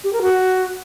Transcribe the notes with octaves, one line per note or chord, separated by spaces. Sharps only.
G4
A#4
F#4